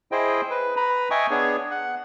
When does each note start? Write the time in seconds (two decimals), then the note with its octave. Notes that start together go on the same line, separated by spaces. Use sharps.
0.12 E4 G#4 C5 D#5 G5
0.50 B4
0.77 B4 A#5 B5
1.11 D#5 E5 G5 G#5 C#6 D#6
1.30 B3 D4 G#4 C#5
1.70 F#5